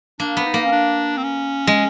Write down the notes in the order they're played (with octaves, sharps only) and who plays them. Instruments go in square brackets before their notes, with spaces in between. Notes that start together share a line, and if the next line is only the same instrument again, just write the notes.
[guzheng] A#3 [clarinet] D4
[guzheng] B3
[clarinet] D#4
[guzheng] A#3
[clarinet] C#4
D4
C4
C#4
[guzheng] G#3